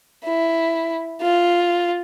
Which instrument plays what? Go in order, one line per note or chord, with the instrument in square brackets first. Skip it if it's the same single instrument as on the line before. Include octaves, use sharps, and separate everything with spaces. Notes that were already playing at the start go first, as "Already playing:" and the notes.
[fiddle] E4
F4